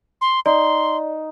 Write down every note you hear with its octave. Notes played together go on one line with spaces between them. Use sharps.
C6
D#4 D5 C6